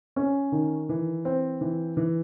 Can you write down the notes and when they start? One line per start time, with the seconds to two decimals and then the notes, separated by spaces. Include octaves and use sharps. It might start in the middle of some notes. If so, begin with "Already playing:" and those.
0.16 C#4
0.52 D#3
0.89 E3
1.25 C4
1.61 E3
1.97 E3